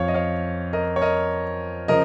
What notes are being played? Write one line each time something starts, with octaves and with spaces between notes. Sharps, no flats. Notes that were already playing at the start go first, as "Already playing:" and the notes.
Already playing: F2 F3 C#5 F5
D#5
C#5 F5
A#4 D#5
C#5
A#4 D#5
C#3 F3 A#4 D#5